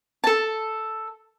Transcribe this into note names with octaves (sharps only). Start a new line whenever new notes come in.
A4 A5